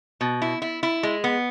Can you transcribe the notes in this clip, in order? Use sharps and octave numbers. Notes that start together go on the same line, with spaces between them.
B2
E4
E4
E4
G#3
B3